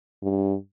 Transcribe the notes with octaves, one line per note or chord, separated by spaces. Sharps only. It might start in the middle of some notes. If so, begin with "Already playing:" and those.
G2